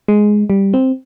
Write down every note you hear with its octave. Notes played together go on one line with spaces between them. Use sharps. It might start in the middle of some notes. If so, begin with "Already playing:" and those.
G#3
G3
C4